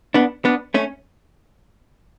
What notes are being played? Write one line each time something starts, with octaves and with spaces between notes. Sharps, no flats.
B3 D4
B3 D4
A3 C#4